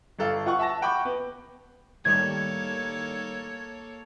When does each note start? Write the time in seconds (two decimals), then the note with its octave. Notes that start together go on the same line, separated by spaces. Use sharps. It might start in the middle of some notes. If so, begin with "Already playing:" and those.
0.19 G1 A4 F5
0.46 F4 F#5 C#6 F#6
0.59 E5 A5 A#6
0.82 F#5 G5 B5 C#6 D6 G6
1.05 B3
2.05 A2 D#3 G3 A#3 A4 C#5 G#6